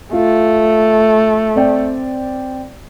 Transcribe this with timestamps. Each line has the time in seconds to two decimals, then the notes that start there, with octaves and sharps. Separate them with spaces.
0.13 A3 F4
1.56 C4 D5 G5